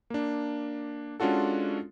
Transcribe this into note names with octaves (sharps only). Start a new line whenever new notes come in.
A#3 D4
G#3 C#4 D4 F4 F#4 A4